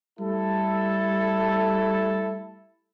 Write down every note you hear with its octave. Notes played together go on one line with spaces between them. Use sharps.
G3 A3 E4 A4